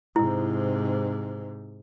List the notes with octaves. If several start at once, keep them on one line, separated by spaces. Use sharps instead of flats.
G#2 C3 E4